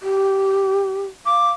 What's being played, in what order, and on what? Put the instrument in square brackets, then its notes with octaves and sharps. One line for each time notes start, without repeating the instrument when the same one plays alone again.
[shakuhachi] G4
[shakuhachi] F5 [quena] D6